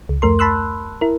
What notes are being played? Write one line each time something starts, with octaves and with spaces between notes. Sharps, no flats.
C#2
F2 A3 A#4 C6
A5 B5 C6 E6 F#6
E4 A#4